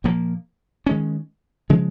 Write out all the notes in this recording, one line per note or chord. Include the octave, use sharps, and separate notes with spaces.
A#2 F3 A#3
D#3 G#3 C#4
C#3 F3 G#3